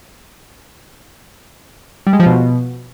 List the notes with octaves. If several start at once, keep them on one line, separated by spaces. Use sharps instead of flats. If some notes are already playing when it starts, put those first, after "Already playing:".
G3
G#3
F3
B2